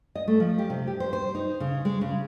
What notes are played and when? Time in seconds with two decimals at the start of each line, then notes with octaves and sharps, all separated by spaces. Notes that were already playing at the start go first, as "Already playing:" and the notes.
0.15 D#5
0.28 A3
0.40 F3
0.58 G4
0.70 C3
0.87 G4
1.00 C5
1.13 C5
1.35 D#4
1.60 C#3
1.85 G#3
2.01 C#3